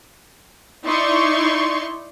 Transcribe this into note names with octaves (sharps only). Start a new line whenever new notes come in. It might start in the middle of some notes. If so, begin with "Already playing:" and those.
D#4 E4 D5 C6 C#6